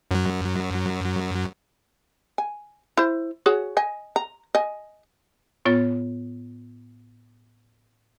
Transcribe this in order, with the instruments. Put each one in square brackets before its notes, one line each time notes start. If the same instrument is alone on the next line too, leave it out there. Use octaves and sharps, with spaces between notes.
[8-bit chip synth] F#2 F#3
[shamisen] G#5
E4 C5
F#4 G#4 C#5
D#5 G#5
A#5
D#5 G#5
[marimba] A2 B3 F4 C#5 A6